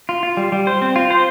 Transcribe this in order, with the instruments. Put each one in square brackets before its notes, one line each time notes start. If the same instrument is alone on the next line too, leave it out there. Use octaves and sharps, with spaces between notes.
[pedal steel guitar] F4
F4
G3
G3
C5
C4
F4
C5